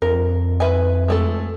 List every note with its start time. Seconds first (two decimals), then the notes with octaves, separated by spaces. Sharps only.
0.02 F2 A#4
0.60 B4 E5 G#5
1.08 G#3 A3 A4